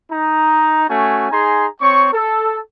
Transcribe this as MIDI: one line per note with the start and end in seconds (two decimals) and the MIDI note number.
0.11 0.85 63
0.11 0.85 82
0.89 1.29 57
0.89 1.29 61
0.89 1.29 66
0.89 1.29 80
1.31 1.66 63
1.31 1.66 68
1.31 1.66 80
1.31 1.66 82
1.31 1.66 84
1.81 2.09 60
1.81 2.09 73
1.81 2.09 85
2.13 2.60 69